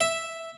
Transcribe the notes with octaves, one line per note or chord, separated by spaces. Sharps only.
E5